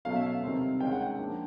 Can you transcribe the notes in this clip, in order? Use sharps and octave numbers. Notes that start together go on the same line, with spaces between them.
B2 F#3 A3 C#4 F5
E5
F5
C3 D#3 G3 C4
D#3 G#3 C#4 G5
F#5
G5
F3 A#3 D4